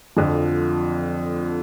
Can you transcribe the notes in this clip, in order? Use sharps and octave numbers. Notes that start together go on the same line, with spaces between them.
F2 D3 F3